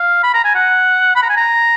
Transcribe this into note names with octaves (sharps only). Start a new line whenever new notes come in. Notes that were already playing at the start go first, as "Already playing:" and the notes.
Already playing: F5
B5
A#5
G#5
F#5
B5
A#5
G#5
A#5